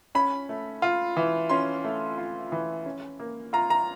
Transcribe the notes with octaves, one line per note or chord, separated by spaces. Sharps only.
C#4 B5
A3
F4
E3
C#4 C6
A3
F4
E3
C#4
A#3
F4 A#5
A#5